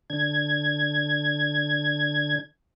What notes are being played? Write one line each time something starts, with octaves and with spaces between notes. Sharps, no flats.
D3 G#6